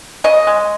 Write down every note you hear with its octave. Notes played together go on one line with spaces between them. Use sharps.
C#3 D#5
G#3